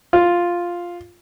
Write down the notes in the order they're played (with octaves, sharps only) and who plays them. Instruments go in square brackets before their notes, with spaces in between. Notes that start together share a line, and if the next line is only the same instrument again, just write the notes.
[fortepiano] F4